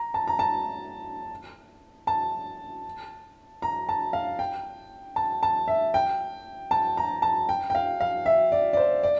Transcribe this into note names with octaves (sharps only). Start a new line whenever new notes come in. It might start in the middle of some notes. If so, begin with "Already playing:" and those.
Already playing: A#5
A5
A#5
A5
A5
A#5
A5
F5
G5
A5
A5
E5
G5
A5
A#5
A5
G5
G5
F5
F5
E5
D5
D5
C5
D5